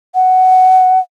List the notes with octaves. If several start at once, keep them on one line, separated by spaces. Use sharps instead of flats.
F#5